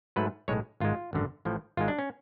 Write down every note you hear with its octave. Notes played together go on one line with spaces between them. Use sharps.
G#2 F#3 A3 B4
B1 A2 G#3 C#5
G#1 G#2 G#3 F4
G#1 F#2 D3
A1 A2 F3
G#1 G#2 G#3 F4
D4
C#4